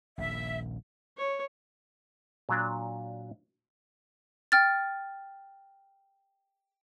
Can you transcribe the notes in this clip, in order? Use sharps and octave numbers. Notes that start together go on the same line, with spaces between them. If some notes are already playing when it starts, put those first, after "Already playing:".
D#1 A#1 E5
C#5
A#2 F#3 D4
G5 F6 A6